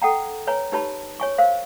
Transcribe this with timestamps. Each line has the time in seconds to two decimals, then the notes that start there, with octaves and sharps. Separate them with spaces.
0.02 A4 F#5 G5 A#5
0.47 B4 C#5 G#5 A#5
0.72 D#4 G4 B4 C#5 A5 B5
1.20 C#5 G#5 C#6
1.38 A#4 C5 F5